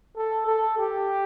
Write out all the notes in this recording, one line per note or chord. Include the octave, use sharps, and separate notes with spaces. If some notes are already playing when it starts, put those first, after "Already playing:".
A4
A4
G4